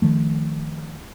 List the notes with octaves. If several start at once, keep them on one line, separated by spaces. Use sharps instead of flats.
D#3 F3 A3